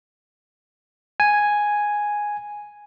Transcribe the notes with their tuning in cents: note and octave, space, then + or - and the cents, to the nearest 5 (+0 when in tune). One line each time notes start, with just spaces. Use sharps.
G#5 +0